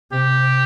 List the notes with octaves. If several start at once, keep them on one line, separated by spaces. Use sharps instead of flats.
C3 G4